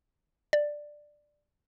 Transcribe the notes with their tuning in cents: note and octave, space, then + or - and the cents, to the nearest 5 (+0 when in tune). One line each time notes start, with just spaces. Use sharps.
D5 +10